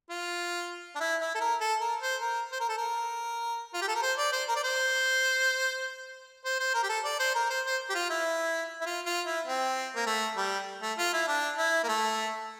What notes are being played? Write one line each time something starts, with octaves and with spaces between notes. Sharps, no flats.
F4
D4
E4
E4
A4
A#4
A4
A#4
C5
A#4
C5
A#4
A4
A#4
F4
G4
A4
A#4
C5
D5
C5
A#4
D5
C5
C5
C5
A#4
G4
A4
D5
C5
A#4
C5
C5
G4
F4
E4
E4
F4
F4
E4
C4
A#3
A3
G3
A3
F4
E4
D4
E4
A#3
A3